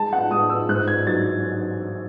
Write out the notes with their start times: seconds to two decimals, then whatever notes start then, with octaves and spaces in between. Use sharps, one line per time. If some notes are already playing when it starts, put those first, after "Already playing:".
Already playing: G#3 A5
0.13 F#5
0.31 G#3 D#6
0.49 E6
0.69 G#2 F#6
0.87 G#6
1.06 F#3 A6